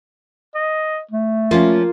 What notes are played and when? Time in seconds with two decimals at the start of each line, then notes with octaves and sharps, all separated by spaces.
0.55 D#5
1.11 A3
1.51 F3 A#3 C#4 F4